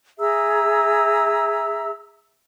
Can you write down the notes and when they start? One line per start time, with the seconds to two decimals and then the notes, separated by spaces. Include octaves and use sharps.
0.19 G#4 E5 A#5 E6